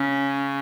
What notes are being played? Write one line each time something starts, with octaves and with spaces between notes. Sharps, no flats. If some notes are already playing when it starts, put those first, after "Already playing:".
Already playing: C#3 C#4